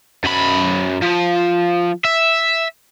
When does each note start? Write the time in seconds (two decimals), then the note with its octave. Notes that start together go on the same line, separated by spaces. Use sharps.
0.24 F#2 B5
1.02 F3
2.05 E5